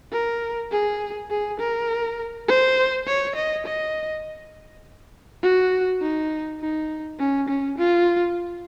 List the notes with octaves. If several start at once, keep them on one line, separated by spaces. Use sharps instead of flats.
A#4
G#4
G#4
A#4
C5
C#5
D#5
D#5
F#4
D#4
D#4
C#4
C#4
F4